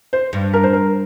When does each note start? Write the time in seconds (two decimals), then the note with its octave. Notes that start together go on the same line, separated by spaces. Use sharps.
0.13 C5
0.33 G2
0.53 A#4
0.63 C5
0.73 A#4